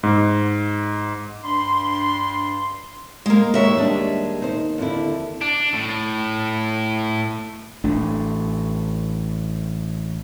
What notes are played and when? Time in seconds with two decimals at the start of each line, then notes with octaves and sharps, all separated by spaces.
0.03 G#2
1.44 G2 D4 B5 C6
3.26 G#3 A#3
3.54 D#2 G#3 C#5 E5
3.77 G3 G#3 D4
4.42 D#4 C5
4.78 F2 D3 E4
5.42 D4
5.73 A2
7.84 A1 A3 D4